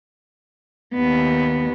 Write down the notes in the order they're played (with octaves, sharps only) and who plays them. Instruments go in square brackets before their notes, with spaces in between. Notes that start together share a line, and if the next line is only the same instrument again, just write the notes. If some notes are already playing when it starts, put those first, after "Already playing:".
[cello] D#2 B3